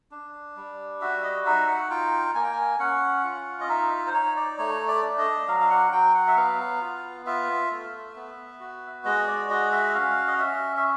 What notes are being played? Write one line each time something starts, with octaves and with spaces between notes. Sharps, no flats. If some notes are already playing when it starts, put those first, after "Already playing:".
D4
G3
F#4 E5
D#5
D#4 E5
F#5
F4 G5
A#3 G#5
G5
G#5
C#4 F#5
F4
D#5
D#4 E5
C5
D#4 C#5
D5
A3 C#5
D5
D4
D#5
F#3 F5
F5
F#5
F#3 G5
F#5
E5
B3 F5
F4
F4 E5
A3
B3
F#4
G#3 D#5
D5
F#4 D#5
E5
C#4 F5
D#5
C#4 E5
E5